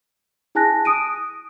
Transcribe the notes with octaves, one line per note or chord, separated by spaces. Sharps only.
E4 G#4 G#5 A5 F#6 A#6
D#6 D7 D#7